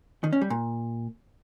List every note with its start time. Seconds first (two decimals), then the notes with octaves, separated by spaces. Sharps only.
0.24 D#3
0.33 C#4
0.41 G3
0.50 A#2